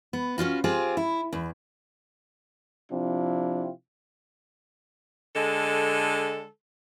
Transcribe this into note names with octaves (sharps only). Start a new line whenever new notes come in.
B3
C#4 D4 F4 F#4
C4 F4 G4 G#4 C5
E4
E2
C3 F3 C4 D4 E4 F4
D3 G#3 A4